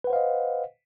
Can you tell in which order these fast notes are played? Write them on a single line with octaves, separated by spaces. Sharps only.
B4 F#5 C5 F5 D#5